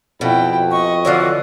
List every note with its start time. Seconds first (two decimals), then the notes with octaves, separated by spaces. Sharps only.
0.21 F2 B2 E4 G5
0.71 D#5 C#6
1.05 D3 E3 F#3 F4 F#4 D5